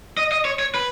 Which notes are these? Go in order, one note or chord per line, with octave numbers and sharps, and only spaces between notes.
D#5
D#5
C#5
C#5
B4